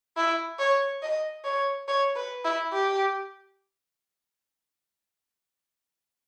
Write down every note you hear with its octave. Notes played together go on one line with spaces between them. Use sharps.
E4
C#5
D#5
C#5
C#5
B4
E4
G4